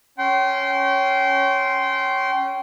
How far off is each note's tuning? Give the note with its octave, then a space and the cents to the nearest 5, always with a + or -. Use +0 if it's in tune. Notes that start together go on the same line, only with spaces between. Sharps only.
C#4 +0 G5 -30 C6 +0